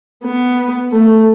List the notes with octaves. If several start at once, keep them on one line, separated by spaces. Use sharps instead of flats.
B3
A3